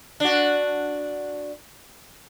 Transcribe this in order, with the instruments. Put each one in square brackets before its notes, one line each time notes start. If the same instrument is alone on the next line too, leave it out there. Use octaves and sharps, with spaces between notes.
[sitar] D4 F#4